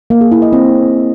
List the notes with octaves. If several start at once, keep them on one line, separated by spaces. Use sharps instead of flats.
A#3
G#4
E4
D#5
C4